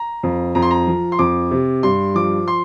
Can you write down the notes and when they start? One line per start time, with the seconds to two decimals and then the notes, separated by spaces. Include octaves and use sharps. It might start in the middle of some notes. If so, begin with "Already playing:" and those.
Already playing: A#5
0.23 F2
0.55 F2 A#5
0.62 C6
0.71 A#5
0.87 F3
1.12 C6
1.19 F2 D6
1.51 C3
1.83 G2 C6
2.15 F3 D6
2.48 C6